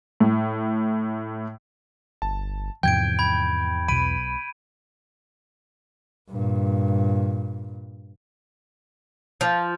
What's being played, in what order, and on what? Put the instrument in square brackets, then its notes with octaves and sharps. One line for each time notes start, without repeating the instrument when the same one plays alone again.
[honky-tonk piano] A2
[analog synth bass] G1 [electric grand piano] A5
[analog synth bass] E2 [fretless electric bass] G#2 C3 F3 [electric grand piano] G5 [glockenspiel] G6 G#6 D7
[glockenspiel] B5 G#6
[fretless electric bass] B1 B2 [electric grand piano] B5 [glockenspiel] D7 D#7
[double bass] G2 A#2
[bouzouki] F3